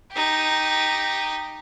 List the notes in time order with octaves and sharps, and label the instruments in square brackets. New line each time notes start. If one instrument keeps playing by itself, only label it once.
[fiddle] D#4 G4